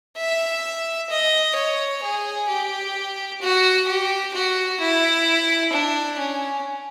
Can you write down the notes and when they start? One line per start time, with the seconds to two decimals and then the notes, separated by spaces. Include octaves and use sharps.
0.17 E5
1.10 D#5
1.55 C#5
2.02 G#4
2.49 G4
3.41 F#4
3.88 G4
4.34 F#4
4.80 E4
5.72 D4
6.18 C#4